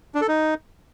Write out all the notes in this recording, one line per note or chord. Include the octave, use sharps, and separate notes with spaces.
D4
A4
D#4